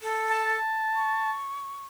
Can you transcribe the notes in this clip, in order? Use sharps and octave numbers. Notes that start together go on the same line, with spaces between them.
A4
A5
C#6